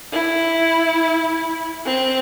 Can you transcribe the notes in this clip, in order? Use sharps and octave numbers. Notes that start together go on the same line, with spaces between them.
E4
C4